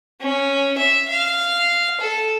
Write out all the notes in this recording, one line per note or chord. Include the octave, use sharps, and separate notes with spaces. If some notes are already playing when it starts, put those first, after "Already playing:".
C#4
E5
F5
A4